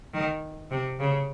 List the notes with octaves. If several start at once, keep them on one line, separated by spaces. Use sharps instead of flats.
D#3
C3
C#3